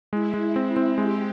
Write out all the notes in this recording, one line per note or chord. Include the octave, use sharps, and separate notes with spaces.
G#3 E4
G#3
C4 E4
C4
G#3 G4